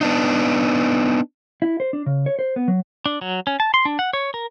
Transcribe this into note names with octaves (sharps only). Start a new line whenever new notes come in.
B3 D4 D#4
E4
C5
D4
C#3
C#5
C5
B3
F#3
D4
F#3
C#4
A5
C6
D4
F#5
C#5
A#4